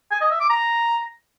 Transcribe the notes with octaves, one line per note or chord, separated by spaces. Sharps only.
G#5
D#5
E5
D6
A#5